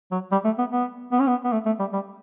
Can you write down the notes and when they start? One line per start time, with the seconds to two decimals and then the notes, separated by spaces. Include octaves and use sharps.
0.12 F#3
0.32 G3
0.45 A3
0.59 B3
0.72 B3
1.12 B3
1.20 C#4
1.27 B3
1.45 B3
1.52 A3
1.66 A3
1.80 G3
1.93 G3